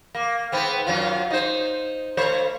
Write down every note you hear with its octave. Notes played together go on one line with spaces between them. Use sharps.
A#3
G#2 B3 C4
F#2 F#3 F4
D#4 C5
A3 C5 C#5